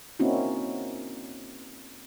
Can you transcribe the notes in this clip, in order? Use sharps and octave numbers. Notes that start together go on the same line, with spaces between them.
A#3 C4 C#4 D#4 E4 F#4